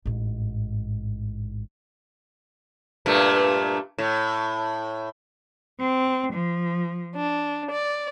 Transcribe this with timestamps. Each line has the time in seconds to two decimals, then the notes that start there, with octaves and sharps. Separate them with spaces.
0.05 A1 G#2
3.06 G2 A#2 A3
3.98 A2
5.80 C4
6.32 F3
7.15 D4
7.71 D5